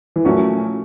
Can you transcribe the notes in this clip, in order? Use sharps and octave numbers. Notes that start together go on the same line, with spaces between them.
E3
A#2 F3 F#3 A3 C#4 F#4